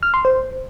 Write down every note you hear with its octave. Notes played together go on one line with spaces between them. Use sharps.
F6
C6
C5